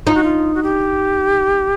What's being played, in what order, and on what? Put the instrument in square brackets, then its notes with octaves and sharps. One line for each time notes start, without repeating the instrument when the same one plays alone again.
[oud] D#4 [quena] F4
[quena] F#4
F4
F#4
G4